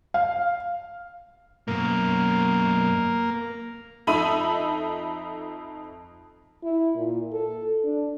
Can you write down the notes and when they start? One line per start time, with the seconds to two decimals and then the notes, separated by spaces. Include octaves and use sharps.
0.14 F5
1.68 F#2 B2 A#3
4.07 F2 D#4 A4 E5 B5 D#7
6.63 E4
6.96 A#2
7.32 A4
7.84 D4